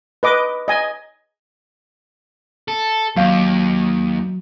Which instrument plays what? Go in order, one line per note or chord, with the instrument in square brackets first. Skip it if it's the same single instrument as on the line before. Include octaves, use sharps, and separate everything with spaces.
[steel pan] B4 D#5 D6
D#5 G#5
[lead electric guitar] A4
[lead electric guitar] D#2 [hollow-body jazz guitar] F#3 F5